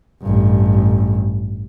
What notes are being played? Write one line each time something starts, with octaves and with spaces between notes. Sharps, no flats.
A1 G2